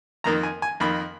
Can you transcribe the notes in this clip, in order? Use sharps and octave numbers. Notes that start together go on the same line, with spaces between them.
F2 D#3 A#3 A#5
G#5
G#5
F2 D#3 A#3 B5